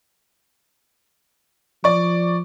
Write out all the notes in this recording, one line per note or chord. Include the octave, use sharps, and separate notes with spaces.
F3 D5 C#6